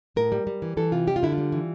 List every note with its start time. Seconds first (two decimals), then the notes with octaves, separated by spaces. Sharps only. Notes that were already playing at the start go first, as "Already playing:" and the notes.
0.16 A2 A#4
0.32 G3
0.47 G3
0.62 E3
0.77 E3 A4
0.92 C3 F4
1.07 G3 G4
1.16 F4
1.23 D3 E4
1.32 F4
1.38 G3
1.52 E3